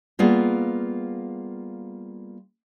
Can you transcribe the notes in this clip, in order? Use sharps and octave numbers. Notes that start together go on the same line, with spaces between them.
G3 A#3 B3 F4 G#4